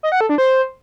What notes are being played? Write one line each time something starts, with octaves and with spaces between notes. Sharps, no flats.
D#5
F#5
A4
D4
C5